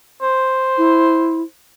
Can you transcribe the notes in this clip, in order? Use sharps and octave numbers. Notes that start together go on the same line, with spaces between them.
C5
E4